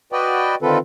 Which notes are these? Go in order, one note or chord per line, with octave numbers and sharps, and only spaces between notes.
F#4 B4 D5 D#5 G5
D3 D#3 C4 F4 A4 B4